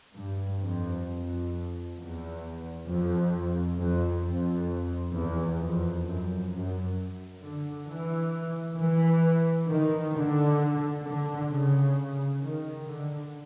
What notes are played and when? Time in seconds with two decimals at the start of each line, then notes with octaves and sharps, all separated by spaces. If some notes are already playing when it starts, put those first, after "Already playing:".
0.16 G2
0.61 F2
1.06 F2
1.97 E2
2.87 F2
3.78 F2
4.24 F2
5.15 E2
5.60 F2
6.05 F#2
6.51 F#2
7.42 D3
7.87 E3
8.78 E3
9.69 D#3
10.14 D3
11.04 D3
11.50 C#3
12.41 D#3
12.86 D3